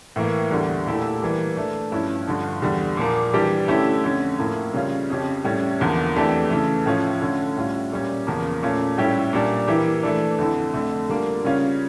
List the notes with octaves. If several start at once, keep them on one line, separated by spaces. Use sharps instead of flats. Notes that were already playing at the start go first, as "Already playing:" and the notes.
A2 E3 A#3
E2 D3 G3
A#2 A3 E4 G4
E3 G3 A#3
E3 A3 D4
G2 F3 C#4 E4
G2 D3 F3
E2 D3 G3
A#2 F3 A#3
E3 G3 D4 G4
D3 A3 C#4 E4 G4
F2 D3 A3 C#4
A2 F3 A#3 E4
C#3 G3 C#4 F4
F2 C#3 F3 C#4 G4
A2 G3 C#4
E2 D3 F3 A#3
F2 E3 A3 D4 G4
C#3 E3 A3
A2 F3 C#4 F4
D3 A3 C#4
A2 G3 C#4 F4
A#2 G3 C#4
E2 C#3 F3 A#3
A#2 A3 C#4 F4
A2 G3 C#4 E4 G4
A#2 G3 D4
E3 A#3 E4 G4
E3 A3 D4
F2 D3 A3 E4
F2 D3 A3
D3 G3 A#3 D4 F4
C#3 G3 C#4 F4